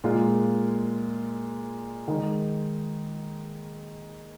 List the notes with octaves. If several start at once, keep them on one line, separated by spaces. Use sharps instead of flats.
A#2 G#3 F4
D#3 G#3 D#4